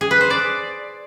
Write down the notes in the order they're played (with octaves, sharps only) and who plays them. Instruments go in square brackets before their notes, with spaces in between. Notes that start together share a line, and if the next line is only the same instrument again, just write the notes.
[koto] G#4
B4
C5
D5